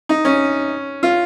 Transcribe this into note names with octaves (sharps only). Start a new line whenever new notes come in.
D#4
C#4
F4